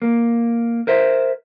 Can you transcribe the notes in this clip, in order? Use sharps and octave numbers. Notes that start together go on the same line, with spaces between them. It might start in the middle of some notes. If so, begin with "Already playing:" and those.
A#3
A#4 C5 E5